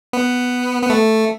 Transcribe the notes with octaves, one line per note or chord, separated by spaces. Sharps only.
B3
B3
A3